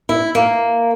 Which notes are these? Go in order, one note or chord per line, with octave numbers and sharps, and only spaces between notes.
E4
A#3